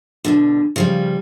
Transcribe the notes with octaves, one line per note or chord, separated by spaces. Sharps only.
E2 B2 D3
C#3 F3 G3